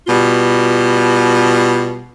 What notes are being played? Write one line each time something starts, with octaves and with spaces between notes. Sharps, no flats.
B2 G3 F4